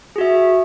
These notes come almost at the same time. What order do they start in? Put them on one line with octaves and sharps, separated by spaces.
G#4 F#4 E5